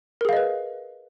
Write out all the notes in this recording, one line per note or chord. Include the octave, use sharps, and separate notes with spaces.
G#4 A#4 B4 D#5 F5